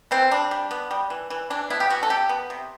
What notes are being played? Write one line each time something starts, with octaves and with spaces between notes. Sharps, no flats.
E3 C4
G3 D4
G3
B3
G3
E3
E3
E3 D4
B3 E4
G4
E3 F#4
A4
C3 G4
B3
C3